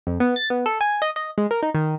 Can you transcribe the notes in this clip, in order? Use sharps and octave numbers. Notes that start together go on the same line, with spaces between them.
F2
B3
A6
B3
A4
G#5
D#5
D#5
G#3
A#4
D#4
D#3